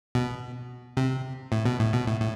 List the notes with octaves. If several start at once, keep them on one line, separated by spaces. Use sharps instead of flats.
B2
C3
A2
B2
A2
B2
A2
A2